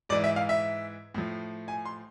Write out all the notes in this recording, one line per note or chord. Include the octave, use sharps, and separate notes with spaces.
G#2 E3 D5
E5
F5
E5
A2 F3
G#5
C6